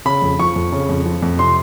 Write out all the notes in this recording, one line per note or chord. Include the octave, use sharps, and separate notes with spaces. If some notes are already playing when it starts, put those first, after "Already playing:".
C#3 B5
F2
F3 C#6
F2
C#3
F2
F3
F2
C3 C6